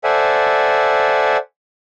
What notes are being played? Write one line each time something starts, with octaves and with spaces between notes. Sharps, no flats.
A4 C5 D5 E5 F#5 G#5